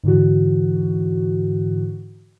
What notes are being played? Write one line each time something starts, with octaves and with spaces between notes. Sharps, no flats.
G#2 D3 E3 F#4